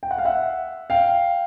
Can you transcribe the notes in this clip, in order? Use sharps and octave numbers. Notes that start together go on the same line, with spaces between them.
G5
F#5
F5
E5 F#5
F5 G5